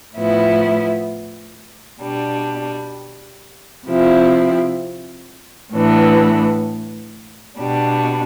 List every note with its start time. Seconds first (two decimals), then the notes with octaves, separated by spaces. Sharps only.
0.15 A2 F3 B3 E4
2.02 B2 G3 D4
3.87 C3 F3 C4 E4
5.74 A2 E3 B3 D4
7.60 B2 G3 D4